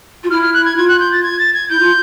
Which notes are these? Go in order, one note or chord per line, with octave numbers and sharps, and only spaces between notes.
F4
E4 F6
F6
F#6
G#6
F4 G#6
F#6
G6
A6
G#6
A6
G#6
E4 G6
F4